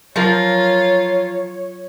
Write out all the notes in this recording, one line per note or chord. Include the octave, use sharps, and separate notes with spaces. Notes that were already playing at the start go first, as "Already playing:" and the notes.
F3 F#3 F4 A#4 C#5